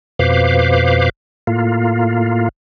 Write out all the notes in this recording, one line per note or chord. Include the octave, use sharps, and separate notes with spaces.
F2 B2 B4 C5 F5 D6
A2 A#3 F4